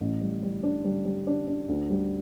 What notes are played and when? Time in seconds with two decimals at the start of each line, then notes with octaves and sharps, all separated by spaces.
0.01 A1
0.21 G3
0.43 G3
0.63 D4
0.84 G3
1.05 G3
1.27 D4
1.47 D4
1.68 D2
1.90 G3